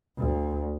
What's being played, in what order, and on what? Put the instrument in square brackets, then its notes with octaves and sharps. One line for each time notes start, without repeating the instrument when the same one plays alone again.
[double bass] D2